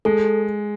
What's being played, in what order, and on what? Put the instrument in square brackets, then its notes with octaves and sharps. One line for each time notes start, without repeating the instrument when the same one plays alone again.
[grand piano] G#3 [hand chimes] A4